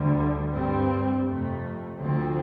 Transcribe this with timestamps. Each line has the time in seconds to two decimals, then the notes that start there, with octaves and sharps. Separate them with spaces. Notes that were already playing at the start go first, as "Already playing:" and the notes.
Already playing: D2 D3 G3
0.52 G2 G3 C4
1.26 F2 C3 A3
1.98 D2 D3 F3 C4